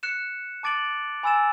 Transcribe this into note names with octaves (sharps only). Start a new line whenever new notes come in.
F#6 C#7 E7
A5 D6 A6 D7 F#7
G#5 B5 E6 A6 E7